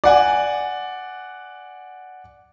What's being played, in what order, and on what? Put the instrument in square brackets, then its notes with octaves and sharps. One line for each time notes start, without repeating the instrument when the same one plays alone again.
[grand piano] D5 F#5 G#5